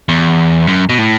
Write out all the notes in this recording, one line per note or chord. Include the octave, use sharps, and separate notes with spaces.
E2
F#2
B2
A2